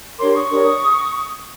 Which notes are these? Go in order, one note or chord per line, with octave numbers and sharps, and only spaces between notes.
D4 G4 A#4 C#5 C6 D6
C#6 D#6
D4 G4 A#4 C#5